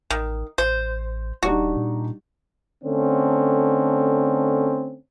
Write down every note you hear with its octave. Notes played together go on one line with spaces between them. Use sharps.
A1 D#3
A1 C5
D#1 G3 D4 D#4 F#4
A#2
D3 A3 C4 C#4